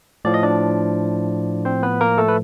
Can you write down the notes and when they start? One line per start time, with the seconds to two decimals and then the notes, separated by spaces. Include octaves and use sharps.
0.25 A2 F3 D5
0.34 D#5
0.43 D4 D5
1.65 C4 C5
1.83 B3 B4
2.01 A#3 A#4
2.18 A3 A4
2.28 B4